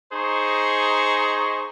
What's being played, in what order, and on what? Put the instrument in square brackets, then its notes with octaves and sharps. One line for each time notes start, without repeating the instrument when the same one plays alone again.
[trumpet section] D#4 G#4 C5 A#5 C#6